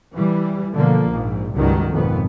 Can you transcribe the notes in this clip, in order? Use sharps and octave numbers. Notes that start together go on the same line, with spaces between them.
E3 G3
B2 D3 F3 A#3
A#1 G#2
C#2 G2 D#3 F#3
G#1 F2 B2 B3